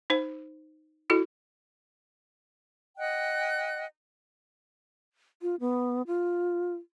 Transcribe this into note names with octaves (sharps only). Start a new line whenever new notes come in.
D#4 C5
E4 F#4 A4
D#5 F#5 G5 F#6
F4
B3
F4